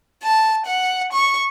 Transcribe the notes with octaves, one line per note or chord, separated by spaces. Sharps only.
A5
F#5
C#6